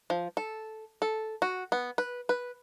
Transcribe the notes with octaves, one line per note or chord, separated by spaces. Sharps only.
F3
A4
A4
F#4
B3
B4
B4